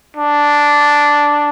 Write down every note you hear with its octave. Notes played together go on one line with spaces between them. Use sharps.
D4